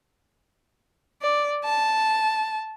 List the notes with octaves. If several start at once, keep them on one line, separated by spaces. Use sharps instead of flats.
D5
A5